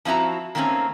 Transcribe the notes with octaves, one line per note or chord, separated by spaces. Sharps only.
F3 C4 E4 F#4 A#5
D#3 A3 A#3 C4 C#4